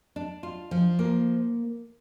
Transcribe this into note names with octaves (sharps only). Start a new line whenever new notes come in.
D4
F4
F3
A#3